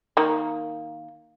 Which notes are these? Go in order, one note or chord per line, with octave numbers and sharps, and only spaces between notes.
D#3 A#3